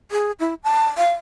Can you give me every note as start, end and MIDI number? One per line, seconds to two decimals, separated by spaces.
0.11 0.32 68
0.40 0.54 64
0.64 0.85 81
0.98 1.11 77